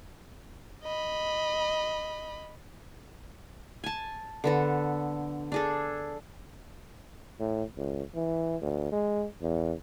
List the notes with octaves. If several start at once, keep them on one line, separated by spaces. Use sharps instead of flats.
D#5 B5
G#5 A5
D3 B3 A4
D4 G#4 A4
A2
C#2
E3
D2
G#3
E2